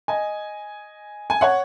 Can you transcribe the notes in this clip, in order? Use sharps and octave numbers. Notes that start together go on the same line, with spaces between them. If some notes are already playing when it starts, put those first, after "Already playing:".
D#5 G#5
G#5
C#5 F#5